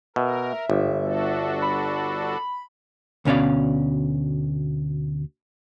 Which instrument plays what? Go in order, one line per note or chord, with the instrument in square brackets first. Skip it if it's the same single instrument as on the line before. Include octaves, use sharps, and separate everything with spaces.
[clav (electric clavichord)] B2 [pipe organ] A#4 [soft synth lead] E5
[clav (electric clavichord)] G1 [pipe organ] G#2
[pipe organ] D4 F#4 A4
[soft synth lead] B5
[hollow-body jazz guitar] D2 B2 C#4 D5 F5